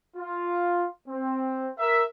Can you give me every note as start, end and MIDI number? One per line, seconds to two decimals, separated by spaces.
0.17 0.85 65
1.08 1.70 60
1.79 2.03 70
1.79 2.03 76